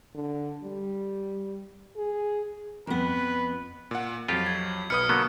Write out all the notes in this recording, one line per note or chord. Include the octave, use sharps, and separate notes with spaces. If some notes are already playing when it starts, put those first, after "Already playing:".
D3
G3
G#4
F2 B3 B4
A#2 F#5
F2 F#3 F4 G4
G#6
B1 B4 D#6 F6 C#7
D3 F#3 A#3 B3